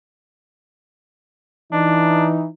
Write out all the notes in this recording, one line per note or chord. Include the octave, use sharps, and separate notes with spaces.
E3 D4 D#4